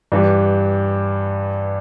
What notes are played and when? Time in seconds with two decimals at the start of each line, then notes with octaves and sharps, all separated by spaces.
0.12 G2 E3 G3